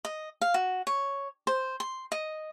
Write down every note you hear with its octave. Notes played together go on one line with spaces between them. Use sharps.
D#5
F5
F#4
C#5
C5
C6
D#5